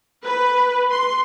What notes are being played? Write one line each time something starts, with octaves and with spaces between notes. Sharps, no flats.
B4
C6